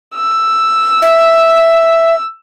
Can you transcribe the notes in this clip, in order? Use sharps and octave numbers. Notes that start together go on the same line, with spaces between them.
E6
E5